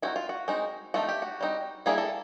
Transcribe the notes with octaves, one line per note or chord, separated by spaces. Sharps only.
D#3 G#3 C4 E4 F#4
F4
F#4
G#3 C4 D#4
F3 A3 C4 D#4 F#4
G4
F#4
G3 C4 D#4
G3 A#3 C#4 E4 G#4
A4